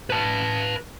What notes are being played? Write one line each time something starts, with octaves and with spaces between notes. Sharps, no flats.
B4 A5